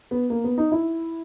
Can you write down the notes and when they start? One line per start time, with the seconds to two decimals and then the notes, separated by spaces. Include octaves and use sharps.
0.11 B3
0.30 A#3
0.44 B3
0.58 D#4
0.72 E4